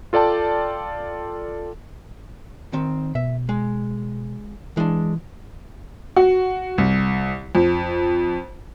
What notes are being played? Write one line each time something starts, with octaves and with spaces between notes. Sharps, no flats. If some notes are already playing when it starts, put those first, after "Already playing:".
F4 A4 D5 G5 A5
D#3 C4
B2 E5
G#3
E3 G#3 D4
F#4
C2
F2